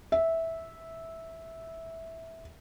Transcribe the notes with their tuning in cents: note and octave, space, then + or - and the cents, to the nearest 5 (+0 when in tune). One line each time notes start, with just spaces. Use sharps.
E5 -10